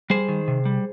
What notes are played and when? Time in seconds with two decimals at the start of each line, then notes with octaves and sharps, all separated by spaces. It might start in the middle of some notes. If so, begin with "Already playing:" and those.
0.10 G3 G#4 C5
0.29 D#3
0.48 C3
0.65 G3